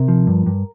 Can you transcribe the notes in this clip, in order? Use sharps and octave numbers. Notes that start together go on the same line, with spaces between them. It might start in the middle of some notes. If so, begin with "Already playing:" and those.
Already playing: C3 A#4
F3
G2
G2